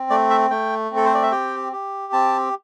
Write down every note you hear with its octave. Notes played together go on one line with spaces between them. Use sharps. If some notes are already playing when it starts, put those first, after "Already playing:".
Already playing: C4
A3 D5
E5
A3 G5
C4
A4
C5
D5
E5
G4 G5
G4
C4 A5